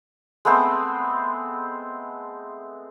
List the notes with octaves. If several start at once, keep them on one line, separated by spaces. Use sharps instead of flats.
G#3 A3 B3 C4